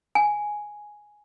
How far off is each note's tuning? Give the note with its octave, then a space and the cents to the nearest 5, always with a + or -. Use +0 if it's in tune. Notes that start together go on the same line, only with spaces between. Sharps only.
G#5 +5